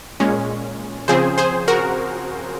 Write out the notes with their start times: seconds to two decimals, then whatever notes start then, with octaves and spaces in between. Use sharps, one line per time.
0.20 A#2 G#3 C#4
1.08 C#3 F3 C4 G#4 C5
1.38 G#4 C5
1.68 F#4 A#4